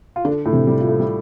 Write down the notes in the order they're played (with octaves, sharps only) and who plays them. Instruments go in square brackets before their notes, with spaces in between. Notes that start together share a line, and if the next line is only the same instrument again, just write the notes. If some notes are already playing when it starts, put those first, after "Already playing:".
[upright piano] F4
[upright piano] D3 D4 [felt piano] A4
[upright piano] A2 A3
[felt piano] C3
[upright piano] G3
[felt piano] F4
[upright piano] A3
G3